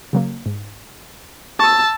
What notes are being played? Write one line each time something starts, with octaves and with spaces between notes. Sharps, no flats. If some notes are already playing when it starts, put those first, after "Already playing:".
C#3 F#3 A#3
G#2
A5 C#6 D#6 E6